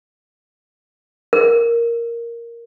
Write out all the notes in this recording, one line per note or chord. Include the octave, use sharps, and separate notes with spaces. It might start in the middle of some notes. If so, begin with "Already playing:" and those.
A#4